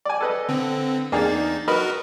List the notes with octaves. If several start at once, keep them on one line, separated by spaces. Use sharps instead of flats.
D5 G#5
A4 B4 D#5
D3 C4
E2 A#3 D4 D#4 G#4 A6
F#4 A#4 B4 D#5 B5 F6